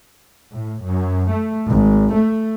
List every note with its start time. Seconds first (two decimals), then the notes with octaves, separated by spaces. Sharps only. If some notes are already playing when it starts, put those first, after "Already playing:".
0.51 A2
0.83 F#2
1.30 A3
1.68 G#1
2.13 A3